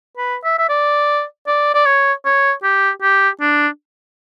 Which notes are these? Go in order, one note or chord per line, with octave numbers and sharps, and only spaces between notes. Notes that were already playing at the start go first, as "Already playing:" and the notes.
B4
E5
E5
D5
D5
D5
C#5
C#5
G4
G4
D4